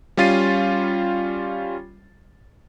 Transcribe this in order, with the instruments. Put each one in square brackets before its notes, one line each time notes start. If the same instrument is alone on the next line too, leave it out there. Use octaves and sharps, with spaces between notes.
[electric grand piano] G3 C#4 F4 A6 C7 D#7